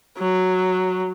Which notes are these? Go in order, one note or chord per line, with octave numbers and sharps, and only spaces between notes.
F#3